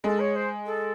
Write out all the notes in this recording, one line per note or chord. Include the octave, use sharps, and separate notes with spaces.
G#3 A4
C#5
C5
A4